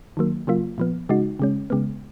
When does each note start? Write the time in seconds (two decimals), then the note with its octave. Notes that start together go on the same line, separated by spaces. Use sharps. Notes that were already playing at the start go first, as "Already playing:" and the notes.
0.17 D#3 F#3 A#3
0.47 C#3 F#3 A#3 F4
0.78 A#2 F3 B3
1.09 C#3 G#3 D#4 F#4
1.39 C#3 G#3 C#4
1.70 C#3 G#3 B3